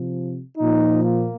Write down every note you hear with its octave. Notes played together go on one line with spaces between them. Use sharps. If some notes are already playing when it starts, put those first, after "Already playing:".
Already playing: C3 F3
A#2 F3 D#4
A#3